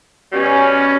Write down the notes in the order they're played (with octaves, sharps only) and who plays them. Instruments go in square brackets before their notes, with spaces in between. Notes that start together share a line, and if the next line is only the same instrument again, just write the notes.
[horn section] B2 G3 C#4